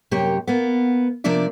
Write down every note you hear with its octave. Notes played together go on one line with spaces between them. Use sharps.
F#2 C3 A#3 G4 C#5
A#3 B3
C3 F3 A#3 D4 D5 E5